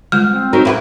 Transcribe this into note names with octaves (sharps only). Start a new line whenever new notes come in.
G3 G#3 F4 F6
C4
F#3 D#4 A#4
E4 F#4 B4